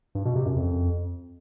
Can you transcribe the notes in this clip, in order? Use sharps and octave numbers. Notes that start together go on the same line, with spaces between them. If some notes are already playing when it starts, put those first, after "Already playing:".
G2
B2
C3
F#2
F2